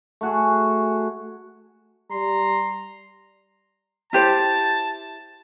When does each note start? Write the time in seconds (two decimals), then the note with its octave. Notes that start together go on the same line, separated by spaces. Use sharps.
0.21 A3 F#4 G#4
2.11 G3 A#5 C6
4.13 E4 G4 C5 A5